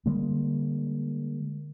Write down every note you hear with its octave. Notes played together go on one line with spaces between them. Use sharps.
D3 G3 G#3 A#3